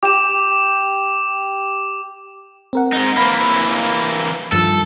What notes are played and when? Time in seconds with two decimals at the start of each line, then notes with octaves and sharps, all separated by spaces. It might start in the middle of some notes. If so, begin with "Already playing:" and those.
0.03 G4 D6 E7
2.73 C4 A#4 F#5
2.92 G#2 D#4
3.17 E3 A#3 B5
4.52 G2 D#3 F3 A4